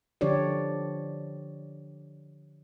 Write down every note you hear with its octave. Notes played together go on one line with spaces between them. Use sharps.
D3 F3 D4 G4 C#5 D5